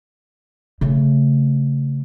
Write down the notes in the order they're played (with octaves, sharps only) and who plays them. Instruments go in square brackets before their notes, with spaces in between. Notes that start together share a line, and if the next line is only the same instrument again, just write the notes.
[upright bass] C#3 A3